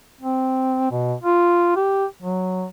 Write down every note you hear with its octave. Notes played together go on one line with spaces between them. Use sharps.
C4
B2
F4
G4
F#3